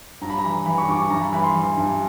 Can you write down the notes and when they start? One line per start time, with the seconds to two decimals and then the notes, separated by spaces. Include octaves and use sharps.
0.21 G2 A#5
0.30 B5
0.38 A#5
0.44 E3
0.66 E3 B5
0.78 C#6
0.88 G2 D6
1.00 C#6
1.10 G2 A#5
1.22 B5
1.33 E3 B5
1.43 C6
1.55 E3
1.77 G2